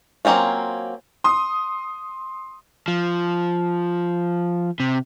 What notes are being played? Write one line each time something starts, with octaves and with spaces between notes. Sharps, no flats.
F#3 A#3 C4 C#4 F4
C6 D#6
F3
C3